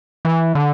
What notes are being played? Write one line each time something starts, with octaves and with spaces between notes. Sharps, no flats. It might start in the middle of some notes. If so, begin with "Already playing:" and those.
E3
D3